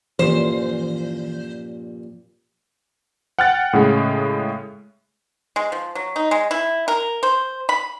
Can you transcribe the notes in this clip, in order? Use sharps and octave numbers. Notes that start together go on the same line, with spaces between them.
G2 A#2 E3 F3 A#3 C#4 C5
F#5 G5 F6 F#6 A6
A2 C#3 G#3
G#3
F3
F#3
D#4
G#3
E4
A#4
C5
B5